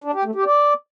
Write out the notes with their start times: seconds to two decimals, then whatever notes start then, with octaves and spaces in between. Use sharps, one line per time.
0.04 D4
0.14 G4
0.25 A3
0.35 G4
0.45 D5